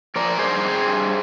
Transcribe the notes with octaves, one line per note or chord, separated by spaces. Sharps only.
F3 A#4 D5
G2 G#4 C5
C4
G2